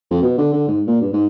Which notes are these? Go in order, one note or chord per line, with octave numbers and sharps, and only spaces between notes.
F2
B2
D3
D3
G#2
A#2
G2
G#2